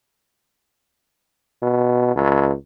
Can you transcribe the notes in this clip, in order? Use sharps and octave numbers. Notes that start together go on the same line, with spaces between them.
B2
C#2